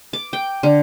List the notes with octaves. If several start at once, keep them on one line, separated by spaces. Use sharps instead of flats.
D6
G5
D3